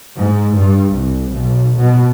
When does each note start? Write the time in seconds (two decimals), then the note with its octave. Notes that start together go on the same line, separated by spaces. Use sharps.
0.18 G#2
0.55 G2
0.93 C2
1.31 B1
1.76 B2